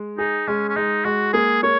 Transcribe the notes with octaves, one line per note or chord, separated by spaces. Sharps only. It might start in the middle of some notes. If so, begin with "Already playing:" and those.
Already playing: G#3
D#4 G#4
G#3 C#4
C#4
G#3 D#4
G#3 F#4
A#3 G#4
A#3 C#5